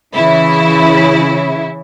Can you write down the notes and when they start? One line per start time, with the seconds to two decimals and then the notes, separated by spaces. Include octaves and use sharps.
0.14 C#3 E3 E4